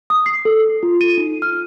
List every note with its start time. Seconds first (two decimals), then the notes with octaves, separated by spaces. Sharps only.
0.10 D#6
0.26 C7
0.45 A4
0.83 F4
1.01 D#7
1.18 D#4
1.42 F6